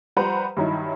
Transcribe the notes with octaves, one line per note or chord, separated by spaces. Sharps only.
F3 G3 B4 C5 F#5 A#5
G2 D#3 F#3 D#4 E4